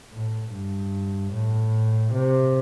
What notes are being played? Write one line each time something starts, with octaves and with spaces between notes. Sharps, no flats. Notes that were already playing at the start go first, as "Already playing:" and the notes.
A2
G2
A2
C3